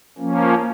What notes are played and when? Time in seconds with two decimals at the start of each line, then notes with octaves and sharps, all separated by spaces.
0.19 F3 A#3 C#4